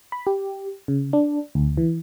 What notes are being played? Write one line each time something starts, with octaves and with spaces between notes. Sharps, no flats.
B5
G4
C#3
D4
D2
E3